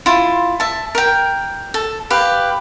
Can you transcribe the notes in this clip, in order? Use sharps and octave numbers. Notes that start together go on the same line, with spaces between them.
E4 F4
E5 A5
A#4 G5
A4
G4 B4 F5